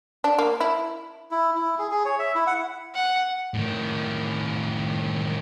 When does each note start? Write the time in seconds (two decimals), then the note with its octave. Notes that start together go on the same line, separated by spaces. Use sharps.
0.24 D4
0.38 A#3
0.60 E4
1.31 E4
1.56 E4
1.79 G#4
1.91 G#4
2.05 C#5
2.19 E5
2.35 E4
2.47 F#5
2.94 F#5
3.54 A2 D#3